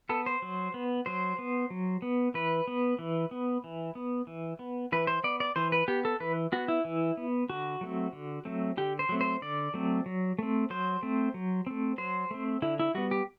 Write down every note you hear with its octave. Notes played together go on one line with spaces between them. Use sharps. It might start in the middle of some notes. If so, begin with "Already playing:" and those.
B3 A4
C5
F#3
B3
F#3 C5
B3
F#3
B3
E3 B4
B3
E3
B3
E3
B3
E3
B3
E3 B4
C5
B3 D5
D5
E3 C5
B4
B3 G4
A4
E3 B4
B3 F#4
E4
E3
B3
D3 F#4
F#3 A3 C4
D3
F#3 A3 C4
D3 G4
C5
F#3 A3 C4
C5
D3 D5
F#3 A3 C4
F#3
A3 C4
F#3 C5
A3 C4
F#3
A3 C4
F#3 C5
A3 C4
D3 E4
E4
G3 B3 F#4
G4